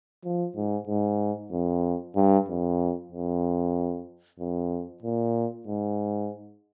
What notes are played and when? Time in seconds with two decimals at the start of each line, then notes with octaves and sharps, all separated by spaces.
0.25 F3
0.56 G#2
0.88 G#2
1.51 F2
2.15 G2
2.48 F2
3.12 F2
4.40 F2
5.02 A#2
5.67 G#2